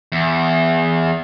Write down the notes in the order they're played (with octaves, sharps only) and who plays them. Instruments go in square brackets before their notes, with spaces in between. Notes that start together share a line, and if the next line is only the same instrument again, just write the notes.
[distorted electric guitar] E2